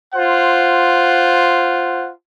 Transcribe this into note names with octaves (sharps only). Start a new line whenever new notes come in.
F4 C5 F#5